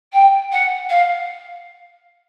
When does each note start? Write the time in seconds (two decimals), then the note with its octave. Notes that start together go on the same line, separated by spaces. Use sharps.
0.12 G5
0.51 F#5
0.89 F5